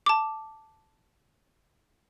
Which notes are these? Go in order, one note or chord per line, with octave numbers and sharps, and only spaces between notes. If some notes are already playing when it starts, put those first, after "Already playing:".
A5 D6